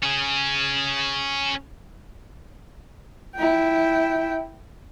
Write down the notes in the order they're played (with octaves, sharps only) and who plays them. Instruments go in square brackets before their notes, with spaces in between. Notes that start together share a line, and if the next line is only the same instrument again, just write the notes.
[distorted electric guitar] C#4 G#4
[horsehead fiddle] E4 G5